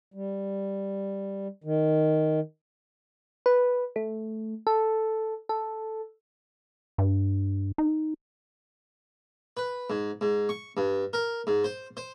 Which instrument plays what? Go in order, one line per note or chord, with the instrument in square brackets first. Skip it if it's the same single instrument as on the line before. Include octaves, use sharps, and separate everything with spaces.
[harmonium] G3
D#3
[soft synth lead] B4
A3
A4
A4
[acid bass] G2
D#4
[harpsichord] B4
G#2
G#2
C#6
G2
A#4
G#2
C5
C5